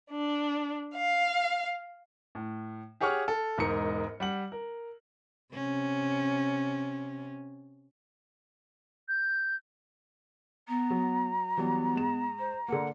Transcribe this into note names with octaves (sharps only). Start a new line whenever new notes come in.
D4
F5
A2
G4 G#4 C#5 F#5 C#6 F6
A4
E1 G#2 D#4 A#4 C#7
G3 F#5 F#7
A#4
C3 C#4
G6
B3 A#5
F#3
E3 F#3 G3 B3
G#2 E7
C5
D3 A#3 F#5